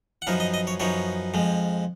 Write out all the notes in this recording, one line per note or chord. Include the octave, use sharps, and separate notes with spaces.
F#5
F#2 F3 B3 D#4 F5
D#5
D#5
C#5
F#2 F3 B3 D#4 C#5
F2 F3 G#3